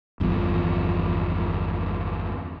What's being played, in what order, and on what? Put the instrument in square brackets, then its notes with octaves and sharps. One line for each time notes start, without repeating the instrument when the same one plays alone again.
[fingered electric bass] G1 E2 G2 F3